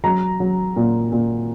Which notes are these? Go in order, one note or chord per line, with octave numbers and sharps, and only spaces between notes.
F#3 A#5
F#3
A#2
A#2